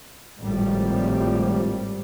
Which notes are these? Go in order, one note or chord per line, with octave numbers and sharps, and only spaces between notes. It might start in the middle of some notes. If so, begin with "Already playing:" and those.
G#1 A2 F3 G3